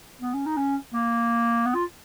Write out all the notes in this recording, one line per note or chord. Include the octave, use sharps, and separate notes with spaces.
B3
C#4
D#4
C#4
A#3
B3
F4